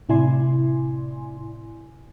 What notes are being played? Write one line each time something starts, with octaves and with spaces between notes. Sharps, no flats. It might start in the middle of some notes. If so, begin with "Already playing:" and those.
A2 C3 E4 D5 G#5 C6